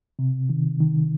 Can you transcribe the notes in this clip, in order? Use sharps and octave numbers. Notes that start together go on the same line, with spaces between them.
C3
D#3
D#3